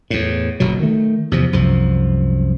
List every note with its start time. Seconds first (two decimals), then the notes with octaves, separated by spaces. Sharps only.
0.10 E2 A2
0.60 F#1 B2 F#3
0.80 D#3 A3
1.31 E2 C3 F3
1.53 C2 F#2 F3